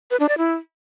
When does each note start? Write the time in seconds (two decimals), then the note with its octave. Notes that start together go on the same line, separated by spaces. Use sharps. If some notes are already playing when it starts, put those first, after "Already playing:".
0.11 B4
0.20 D4
0.29 D5
0.38 E4